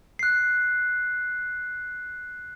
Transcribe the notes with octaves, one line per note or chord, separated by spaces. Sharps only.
F#6 C7